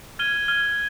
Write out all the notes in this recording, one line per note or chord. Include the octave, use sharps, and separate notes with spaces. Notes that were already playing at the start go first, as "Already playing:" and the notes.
F6 G#6 D#7 G7
F6 G#6 D#7 G7